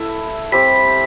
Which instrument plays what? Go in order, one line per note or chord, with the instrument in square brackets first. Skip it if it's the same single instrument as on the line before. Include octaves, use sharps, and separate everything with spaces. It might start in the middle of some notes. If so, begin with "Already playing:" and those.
Already playing: [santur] E4 A4 E5
[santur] G3 C4 G4 [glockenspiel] B6
[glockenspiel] B6